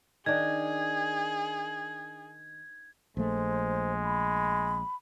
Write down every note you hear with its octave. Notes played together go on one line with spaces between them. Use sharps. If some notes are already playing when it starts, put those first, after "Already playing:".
D#3 D4 G#4 G#6
A#1 G#3 A3 C5
B5